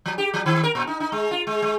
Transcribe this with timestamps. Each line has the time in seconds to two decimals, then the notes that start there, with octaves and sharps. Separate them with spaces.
0.06 F3
0.18 G4
0.34 F3
0.46 D#3
0.63 A#4
0.75 A#2
0.87 D#4
1.00 D#4
1.12 G#3
1.31 F4
1.47 G#3
1.62 G#3